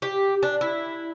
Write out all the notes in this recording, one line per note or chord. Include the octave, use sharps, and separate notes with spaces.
G4
D4
E4